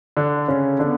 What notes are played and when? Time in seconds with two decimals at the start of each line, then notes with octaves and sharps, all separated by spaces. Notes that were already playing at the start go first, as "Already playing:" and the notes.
0.17 D3 D4
0.48 C#3 C#4
0.79 D3 B3 D4